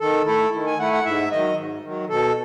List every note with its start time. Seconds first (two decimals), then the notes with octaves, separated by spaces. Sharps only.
0.01 D#3 A4
0.26 A3 E4 A4
0.53 D#3
0.66 G#5
0.79 A3 E4 F#5
0.93 F#5
1.05 G#2 E5
1.32 D#3 F#3 D#5
1.57 G#2
1.84 D#3 F#3
2.09 B2 A4